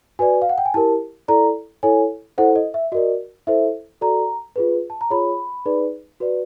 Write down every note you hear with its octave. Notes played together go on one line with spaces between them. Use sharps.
F#4 B4 D5 G#5
F5
F#5
G5
G#5
E4 G4 A#4 A5
E4 A4 D5 A#5
E4 A4 C#5 G#5
E4 A4 C5 F#5
D#5
E5
F#4 A#4 D5 D#5
E4 A4 C5 E5
F#4 A4 D5 A#5
F4 G#4 B4
A5
A#5
F4 G#4 C#5 B5
D#4 G#4 B4 D5
F#4 B4 D5